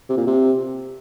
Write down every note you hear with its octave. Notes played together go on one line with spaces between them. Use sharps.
C3
A#2
C3